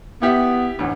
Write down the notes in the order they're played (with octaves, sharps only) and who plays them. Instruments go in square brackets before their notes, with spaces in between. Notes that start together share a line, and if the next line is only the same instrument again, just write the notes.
[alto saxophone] B3 [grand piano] E4 G4 E5
[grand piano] A1 D2